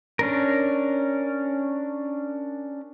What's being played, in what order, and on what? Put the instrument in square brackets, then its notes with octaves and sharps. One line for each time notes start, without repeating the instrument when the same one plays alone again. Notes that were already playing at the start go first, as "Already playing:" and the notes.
[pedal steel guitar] C#4 D4 A#4